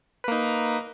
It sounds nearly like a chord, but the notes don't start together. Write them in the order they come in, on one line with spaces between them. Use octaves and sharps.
B4 A#3 D#4